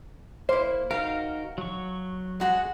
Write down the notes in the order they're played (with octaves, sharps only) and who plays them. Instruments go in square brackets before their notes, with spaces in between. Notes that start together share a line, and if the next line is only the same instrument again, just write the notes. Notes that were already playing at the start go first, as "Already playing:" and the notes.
[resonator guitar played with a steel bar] A#3 E4 [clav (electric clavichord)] C5
[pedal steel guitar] D#4 F#4 A#4 [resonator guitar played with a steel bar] F5
[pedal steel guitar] F#3 C#6
[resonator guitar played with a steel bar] G#3 F#4 F#5